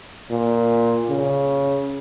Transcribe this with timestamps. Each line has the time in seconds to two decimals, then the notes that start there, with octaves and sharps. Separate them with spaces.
0.30 A#2
1.09 C#3